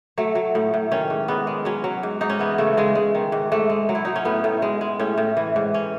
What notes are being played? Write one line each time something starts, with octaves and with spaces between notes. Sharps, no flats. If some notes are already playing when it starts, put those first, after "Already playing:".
F#3 A3
F#3
A2
A2
D#3 C#4
G#2
G#2 B3
G#3
F#3 C#4
F#3
G#2
G#2 D#4
C#4
E3 B3
C#3 A3
C#3 G#3
G#3
D#3
G#2
G#2 A3
G#3
F#3
E4
F#3 D#4
C#4
A2 B3
A2
G#3
G#3
A2 C#4
A2
E3
G#2
C#4